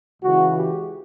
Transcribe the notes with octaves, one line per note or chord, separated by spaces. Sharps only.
C#2 C#3 E3 F#4
G4